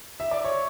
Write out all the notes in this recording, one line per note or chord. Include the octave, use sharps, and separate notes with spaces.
E5
D5
C#5